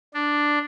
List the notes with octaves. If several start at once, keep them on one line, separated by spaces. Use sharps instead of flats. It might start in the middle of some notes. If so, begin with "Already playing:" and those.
D4